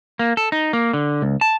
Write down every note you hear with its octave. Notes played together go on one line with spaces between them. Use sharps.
A#3
A4
D#4
A#3
D3
C#2
A5